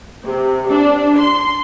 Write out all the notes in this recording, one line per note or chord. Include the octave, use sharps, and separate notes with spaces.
C3
D4
C6